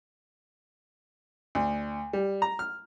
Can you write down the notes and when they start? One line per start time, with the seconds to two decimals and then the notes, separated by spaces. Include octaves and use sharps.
1.55 D2
2.13 G3
2.42 A#5
2.59 F6